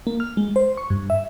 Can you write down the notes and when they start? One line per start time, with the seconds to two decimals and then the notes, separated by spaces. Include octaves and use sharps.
0.07 A#3
0.20 F6
0.37 G#3
0.56 C5
0.77 C#6
0.90 G2
1.10 E5